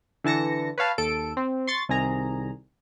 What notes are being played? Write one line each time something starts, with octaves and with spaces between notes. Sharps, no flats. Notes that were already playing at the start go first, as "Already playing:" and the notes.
D3 E3 A5 A#6 C#7
B4 C#5 F5 A5
D#2 A4 D7
C4
C6 C#6 A6 C7
C2 D#3 G#4 A#5